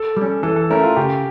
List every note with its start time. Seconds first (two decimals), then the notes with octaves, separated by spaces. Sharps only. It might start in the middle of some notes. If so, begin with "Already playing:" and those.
Already playing: A4
0.17 G3 C#4
0.43 E3 A4
0.56 A4
0.70 A3 C#4 E4 A#4
0.83 F4
0.96 C#3 G4